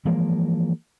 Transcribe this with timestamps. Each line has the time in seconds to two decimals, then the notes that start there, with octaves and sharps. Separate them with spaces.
0.05 E3 F3 G#3 A#3